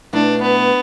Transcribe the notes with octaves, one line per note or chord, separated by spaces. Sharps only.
B2 A3 D4 E4 B4 D5
B3